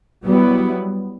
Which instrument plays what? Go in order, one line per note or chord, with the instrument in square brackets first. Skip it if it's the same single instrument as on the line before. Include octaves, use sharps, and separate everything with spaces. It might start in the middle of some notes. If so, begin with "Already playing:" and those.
[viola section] F#3 B3 E4 [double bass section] G3